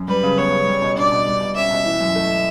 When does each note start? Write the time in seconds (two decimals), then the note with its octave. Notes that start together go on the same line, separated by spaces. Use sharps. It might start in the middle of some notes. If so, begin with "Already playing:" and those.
Already playing: F#2
0.08 G3 B4
0.23 C#3
0.37 B3 C#5
0.52 C#3
0.67 G3
0.82 B2
0.97 D4 D5
1.12 B2
1.27 G3
1.41 B2
1.56 C#4 E5
1.71 B2
1.85 E3
2.00 F#2
2.15 A3